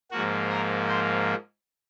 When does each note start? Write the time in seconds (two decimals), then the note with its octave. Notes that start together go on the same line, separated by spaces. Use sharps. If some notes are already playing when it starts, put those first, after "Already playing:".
0.11 G#2 F3 A#3 F#4
0.49 A#4
0.88 C5